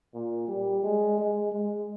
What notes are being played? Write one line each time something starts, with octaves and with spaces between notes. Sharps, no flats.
A#2
G3
G#3
G#3
G#3